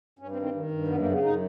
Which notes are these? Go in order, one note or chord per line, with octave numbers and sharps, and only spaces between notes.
G2 C#4
C4
D#3
C4
D#3
G2
F#2 B3
A#3
C#3
B3
F#2 D#4